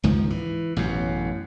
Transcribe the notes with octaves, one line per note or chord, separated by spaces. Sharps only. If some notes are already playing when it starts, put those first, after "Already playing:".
C#2 G#2 D#3 F3
E3
A1 F#2 B2